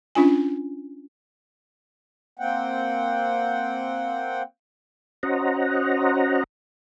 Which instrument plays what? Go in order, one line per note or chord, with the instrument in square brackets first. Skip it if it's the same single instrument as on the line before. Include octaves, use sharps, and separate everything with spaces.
[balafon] C#4 D4 F4 G#5
[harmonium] A#3 C4 F#5 G5
[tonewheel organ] C#4 F#4 C5 D#5 F#5 A#5